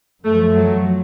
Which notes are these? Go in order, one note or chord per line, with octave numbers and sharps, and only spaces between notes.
F#2 F3 A3
F#3